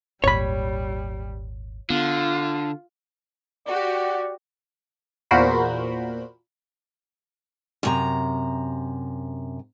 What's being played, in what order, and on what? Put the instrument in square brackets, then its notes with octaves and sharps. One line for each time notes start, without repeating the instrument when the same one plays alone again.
[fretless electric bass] G#1 D#2 A#2 [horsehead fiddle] G3 [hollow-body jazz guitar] C#5 B5
[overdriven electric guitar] D3 [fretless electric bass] B3 [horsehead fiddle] F4
[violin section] F#4 G4 [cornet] D5
[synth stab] E2 A#2 F#4 A#4 C5 B5
[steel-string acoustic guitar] F#2 C3 A#5